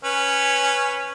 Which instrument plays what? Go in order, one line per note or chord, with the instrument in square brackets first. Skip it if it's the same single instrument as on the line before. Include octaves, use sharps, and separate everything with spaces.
[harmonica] C#4 B4